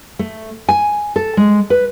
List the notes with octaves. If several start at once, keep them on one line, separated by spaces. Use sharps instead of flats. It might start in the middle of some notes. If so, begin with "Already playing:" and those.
A3
G#5
A4
G#3
B4